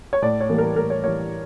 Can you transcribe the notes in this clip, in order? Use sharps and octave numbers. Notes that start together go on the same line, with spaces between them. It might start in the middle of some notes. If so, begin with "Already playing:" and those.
C#5
A2 D5
C#5
E3 G3 A#3
A#4
A2 A#4
C#5
E3 G3 A#3 C#5